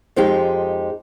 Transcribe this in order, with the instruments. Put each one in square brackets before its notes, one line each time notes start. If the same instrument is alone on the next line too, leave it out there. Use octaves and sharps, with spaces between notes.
[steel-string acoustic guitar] F2 F3 G#3 D#4 G4